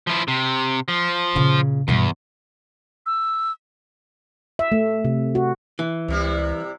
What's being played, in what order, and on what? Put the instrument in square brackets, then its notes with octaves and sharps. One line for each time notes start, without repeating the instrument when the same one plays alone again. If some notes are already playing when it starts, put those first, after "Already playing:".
[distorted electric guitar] F3 E4
C3
F3
[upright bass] A#2 C#3
[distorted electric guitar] E2 [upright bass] G2 B2
[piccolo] E6
[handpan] E5
A3
C3
F#4
[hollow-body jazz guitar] E3
[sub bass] C#2 [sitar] C3 G3 E4